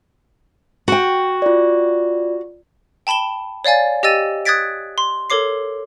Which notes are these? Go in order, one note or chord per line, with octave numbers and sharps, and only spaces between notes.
F#4 G5
F4 D5
G5 A5 B5 E7 G7
C#5 D5 F5 G#5 A6
G4 D#5 G5 E6 A6 D#7
D#6 F#6 G#6 A6 B6 D7
C6
A4 A#4 C#5 D6 C7